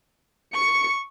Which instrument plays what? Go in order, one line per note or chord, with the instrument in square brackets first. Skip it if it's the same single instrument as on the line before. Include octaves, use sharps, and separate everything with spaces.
[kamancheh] C#6 [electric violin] C#7